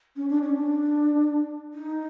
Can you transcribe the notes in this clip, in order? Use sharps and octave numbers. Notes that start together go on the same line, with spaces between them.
C#4
D4
C#4
D4
D#4